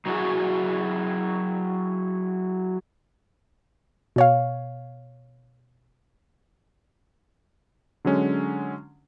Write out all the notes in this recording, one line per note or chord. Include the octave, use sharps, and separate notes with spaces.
F#3 D#4 E4 F#4 G#4
B2 C#5 F5
D3 F#3 G#3 C#4